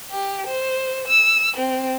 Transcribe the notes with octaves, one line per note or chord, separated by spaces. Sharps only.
G4
C5
E6
C4